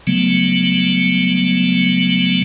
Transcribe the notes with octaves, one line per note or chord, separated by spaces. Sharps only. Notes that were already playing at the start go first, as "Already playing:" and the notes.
C#3 F#3 G3 A3 B3